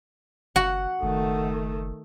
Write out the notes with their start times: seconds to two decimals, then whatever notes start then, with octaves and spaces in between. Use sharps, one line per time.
0.56 F#1 F#4 F#5
1.03 F#1 D#3 A3